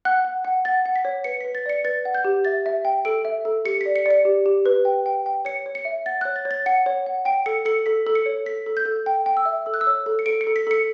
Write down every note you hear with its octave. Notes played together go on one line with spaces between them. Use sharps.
F#5 F#6
F#5
F#5
F#5 A6
F#5
B6
C#5
B4 C#7
B4 B6
A6
D5 C#7
B4 A6
F#5
G6
G4
E5 A6
E5
G5
A4 D7
E5
A4
G4 C#7
D5 B6
C#7
D5 C#7
G4
G4
B4
G5
G5
G5
C#5 C#7
C#5
C#7
E5
F#5 A6
C#5 F#6
A6
C#5
A6
F#5 C#7
C#5
F#5
G5 D7
A4 C#7
A4 C#7
A4 B6
A4
C#7
C#5
A4 B6
A4
G6
A4
G5
G5
E6
E5
A4 E6
F#6
E6
C#5
A4
C#7
A4 D7
C#7
A4
B6
A4 C#7